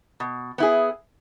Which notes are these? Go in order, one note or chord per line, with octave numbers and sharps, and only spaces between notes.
B2
B3 E4 G#4